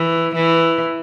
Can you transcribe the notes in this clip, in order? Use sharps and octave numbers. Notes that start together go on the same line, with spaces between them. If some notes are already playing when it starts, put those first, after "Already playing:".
Already playing: E3
E3